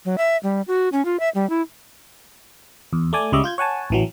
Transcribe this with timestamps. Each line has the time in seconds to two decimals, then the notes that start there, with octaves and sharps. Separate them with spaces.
0.05 F#3
0.18 E5
0.43 G3
0.68 F#4
0.92 C#4
1.05 F4
1.20 E5
1.35 G3
1.50 E4
2.93 E2
3.13 A3 D5 G#5
3.32 C#2 C#3 G3 D#5 E5 D6
3.44 F4 G6 G#6
3.58 C#5 F#5 G#5 A5
3.90 A1 E3 F#3